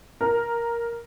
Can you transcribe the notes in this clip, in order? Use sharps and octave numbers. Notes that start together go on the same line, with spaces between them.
A#4